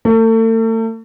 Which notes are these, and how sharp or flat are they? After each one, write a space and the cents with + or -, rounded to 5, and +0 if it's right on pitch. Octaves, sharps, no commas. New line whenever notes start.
A3 +40